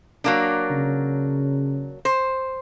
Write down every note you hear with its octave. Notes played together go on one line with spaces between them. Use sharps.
F#3 A#3 D4
C#3
C5